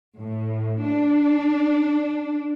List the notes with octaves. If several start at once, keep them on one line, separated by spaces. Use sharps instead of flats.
A2
D4